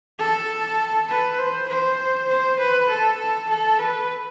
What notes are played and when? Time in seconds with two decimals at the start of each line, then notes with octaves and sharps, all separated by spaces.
0.19 A4
1.08 B4
1.38 C5
1.68 C5
2.28 C5
2.59 B4
2.89 A4
3.49 A4
3.79 B4